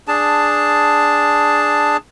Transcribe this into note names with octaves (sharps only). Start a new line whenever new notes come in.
D4 G#4 A5